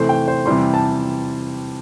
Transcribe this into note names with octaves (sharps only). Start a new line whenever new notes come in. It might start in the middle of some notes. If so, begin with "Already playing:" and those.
Already playing: C3 E3 A3 C5
G5
C5
C3 E3 G3 C6
A5